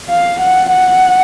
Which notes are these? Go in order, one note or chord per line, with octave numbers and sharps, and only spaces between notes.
F5
F#5
F#5